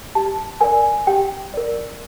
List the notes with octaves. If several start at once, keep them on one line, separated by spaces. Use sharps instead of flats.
G4 A5
A#4 D5 G#5
G4 G5
A#4 D5